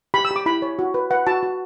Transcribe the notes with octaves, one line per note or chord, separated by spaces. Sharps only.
G4 B5
E6
G4
D6
E4 B5
C#5
F#4
B4
B4 F#5
F#4 A5
F#4